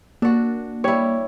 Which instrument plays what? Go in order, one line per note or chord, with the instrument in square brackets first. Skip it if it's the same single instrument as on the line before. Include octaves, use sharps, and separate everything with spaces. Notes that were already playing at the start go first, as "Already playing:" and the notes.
[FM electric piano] A#3 [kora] D4 F#4
[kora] G3 E4 [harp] C#5